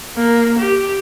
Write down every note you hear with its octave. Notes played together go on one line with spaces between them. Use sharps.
A#3
G4